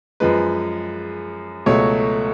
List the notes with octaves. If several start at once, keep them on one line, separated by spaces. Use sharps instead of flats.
F#2 F3 G#3 B4
C#2 B2 F#3 A3 C#5